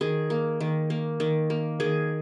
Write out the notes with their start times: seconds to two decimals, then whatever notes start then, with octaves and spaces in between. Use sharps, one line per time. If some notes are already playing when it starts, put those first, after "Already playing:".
0.01 D#3 G#4
0.30 A#3
0.60 D#3
0.90 A#3
1.20 D#3
1.50 A#3
1.80 D#3 G#4